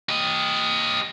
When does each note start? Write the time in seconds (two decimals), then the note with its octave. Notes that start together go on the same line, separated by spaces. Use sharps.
0.09 G4 D#5